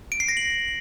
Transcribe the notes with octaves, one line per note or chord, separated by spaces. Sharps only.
D7
C7
A#6
F#7